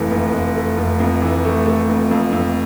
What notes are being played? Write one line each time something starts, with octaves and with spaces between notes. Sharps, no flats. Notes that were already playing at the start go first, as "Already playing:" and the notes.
Already playing: F1 F2 E3 A3
F1
F1
A3
F1
F2
E3
A3
A3
F2
F2
F2